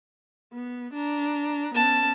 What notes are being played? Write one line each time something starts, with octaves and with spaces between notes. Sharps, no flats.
B3
D4 A#5
B3 C#4 A5